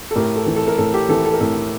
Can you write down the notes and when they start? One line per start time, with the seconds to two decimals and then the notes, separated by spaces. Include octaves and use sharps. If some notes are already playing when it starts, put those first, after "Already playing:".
0.11 A4
0.16 A2 G4 A#4
0.36 A4
0.46 E3
0.56 A4
0.68 A#4
0.78 A2 A4
0.94 G4
1.09 E3 A4
1.25 A4
1.34 A#4
1.40 A2 A4